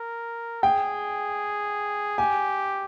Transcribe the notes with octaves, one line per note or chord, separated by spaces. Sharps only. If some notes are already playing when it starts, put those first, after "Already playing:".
Already playing: A#4
G#4 G5
G4 G#5